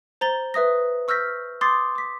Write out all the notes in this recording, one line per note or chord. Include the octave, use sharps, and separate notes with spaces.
C5 A#5 A6 G7
B4 E5 D#6 A#6
C#6 E6 F6 G6 A#6 B6
C6 D6 D#6 G6 A6 C7
D6 B6